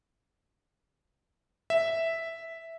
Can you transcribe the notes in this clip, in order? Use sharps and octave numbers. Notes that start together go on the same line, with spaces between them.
E5